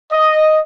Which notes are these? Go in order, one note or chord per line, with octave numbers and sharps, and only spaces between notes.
D#5